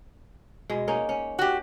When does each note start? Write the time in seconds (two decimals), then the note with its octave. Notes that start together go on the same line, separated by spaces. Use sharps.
0.69 B2 G#3
0.87 A#3 C#4 D#4
1.09 C#4
1.39 F#4 G4